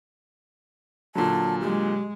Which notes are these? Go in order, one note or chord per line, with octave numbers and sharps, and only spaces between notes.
A#2 D3 F#3 A5
G#3 G4